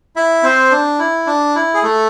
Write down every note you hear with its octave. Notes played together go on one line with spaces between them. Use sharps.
E4 E5
C4 C5
D4
E4
D4
E4
G#4
A3 A4